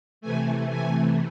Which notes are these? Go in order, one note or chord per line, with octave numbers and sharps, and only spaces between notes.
C3 E3 A3 G#5
G#5